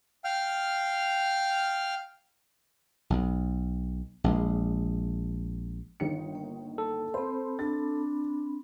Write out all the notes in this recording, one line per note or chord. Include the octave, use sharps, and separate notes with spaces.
F5 G5 F6
B1
A#1 G#3
G1 D#3 C#7
A#3
A4
C4 C5 B5
D4 A6